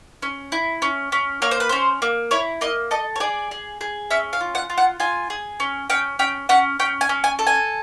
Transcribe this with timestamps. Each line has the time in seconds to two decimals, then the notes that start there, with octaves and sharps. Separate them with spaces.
0.22 C#4
0.52 E4
0.82 C#4
1.12 C#4
1.42 A#3 C#5
1.51 C5
1.60 B4
1.69 C#4 C5
2.02 A#3
2.31 E4 C#5
2.61 A#3 D#5
2.91 A4 D#5
3.16 C#5
3.20 G#4 D5
3.51 G#4
3.81 G#4
4.10 C#4 E5
4.33 F5
4.41 F4
4.55 F#5
4.70 F4
4.78 F#5
5.00 F4 G#5
5.30 G#4
5.60 C#4
5.90 C#4 G5
6.19 C#4 G5
6.49 C#4 F#5
6.79 C#4 G5
7.01 G#5
7.09 C#4
7.24 G#5
7.39 A4
7.47 G#5